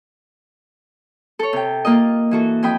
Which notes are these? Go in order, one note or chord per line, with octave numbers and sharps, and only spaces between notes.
A4 C#5
C3 G5
A#3 F4 D#5
E3 F#4 A4
F2 C4 G5 B5 D#6